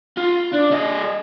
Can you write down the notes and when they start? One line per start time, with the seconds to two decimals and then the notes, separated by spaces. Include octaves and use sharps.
0.17 F4
0.53 D4
0.71 G3 D#5